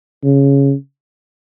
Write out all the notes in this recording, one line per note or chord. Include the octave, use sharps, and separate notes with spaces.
C#3